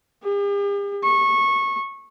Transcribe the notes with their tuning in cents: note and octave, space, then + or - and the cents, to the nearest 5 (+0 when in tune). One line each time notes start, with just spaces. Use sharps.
G4 +45
C#6 -20